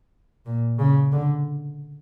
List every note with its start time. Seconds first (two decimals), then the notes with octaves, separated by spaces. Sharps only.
0.46 A#2
0.78 C#3
1.12 D3